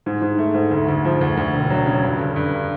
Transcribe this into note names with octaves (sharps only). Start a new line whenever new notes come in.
G#2
G#2
A3
G#2
D2
D2
F3
D2
D2
E1
F#3
C#3
G2
D3
G2